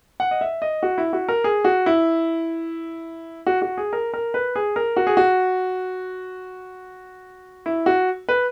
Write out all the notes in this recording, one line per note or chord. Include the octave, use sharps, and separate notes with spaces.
F#5
D#5
E5
D#5
F#4
E4
F#4
A#4
G#4
F#4
E4
F#4
F#4
G#4
A#4
A#4
B4
G#4
A#4
F#4
G#4
F#4
E4
F#4
B4